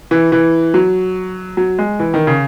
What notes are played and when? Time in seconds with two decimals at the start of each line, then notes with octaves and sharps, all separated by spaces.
0.11 E3
0.32 E3
0.74 F#3
1.57 F#3
1.79 G#3
1.99 E3
2.14 D#3
2.27 C#3